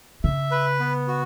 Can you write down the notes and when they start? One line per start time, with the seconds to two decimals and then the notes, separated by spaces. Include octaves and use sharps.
0.24 C#3 E5
0.51 B4
0.80 B3
1.08 F#4